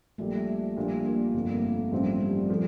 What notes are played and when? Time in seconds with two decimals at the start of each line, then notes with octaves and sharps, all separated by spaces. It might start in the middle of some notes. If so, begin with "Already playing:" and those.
0.18 A#1 A#2 G3 A3
0.76 A#1 A#2 G3 D4 F4
1.05 A#3
1.34 G1 F2 D3
1.52 A#3
1.62 A3
1.92 A1 G2 F3 C4
2.21 G3
2.49 A#2 F3 A3